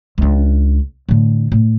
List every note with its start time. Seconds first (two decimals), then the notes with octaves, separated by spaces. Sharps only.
0.18 C#2 D4
1.09 A2 D3
1.52 A2